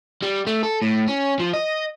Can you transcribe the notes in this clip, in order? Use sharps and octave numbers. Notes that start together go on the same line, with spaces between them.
G3
A3
A4
A2
C#4
F3
D#5